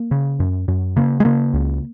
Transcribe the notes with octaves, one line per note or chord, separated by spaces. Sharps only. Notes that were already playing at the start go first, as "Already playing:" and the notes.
Already playing: A#3
C#3
F#2
F#2
C#3 A#3
G#3
C#3 A#3
C#2